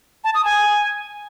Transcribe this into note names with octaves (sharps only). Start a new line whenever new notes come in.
A5
D#6
G#5